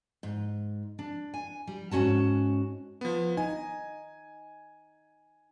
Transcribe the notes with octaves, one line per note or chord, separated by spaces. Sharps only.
G#2
D4
G#5
G3
G#2 C#4 F#4 A5
F3 B3
D#4 G#5